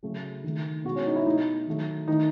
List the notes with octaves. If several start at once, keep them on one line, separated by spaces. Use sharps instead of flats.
C#3 F#3 A3
D#3 A3
B2 G#3 F#4
C#4
D#4
E4
B2 A3 D#4
D#3 F#3 A3
D#3 A3 D#4